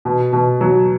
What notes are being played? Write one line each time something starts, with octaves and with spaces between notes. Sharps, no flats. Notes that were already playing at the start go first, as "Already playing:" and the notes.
B2
B2
F#3